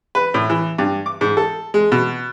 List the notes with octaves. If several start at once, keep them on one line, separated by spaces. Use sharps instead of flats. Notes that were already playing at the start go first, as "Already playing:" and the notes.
B4
A2
E3
G2
D6
G#2
A4
G#3
B2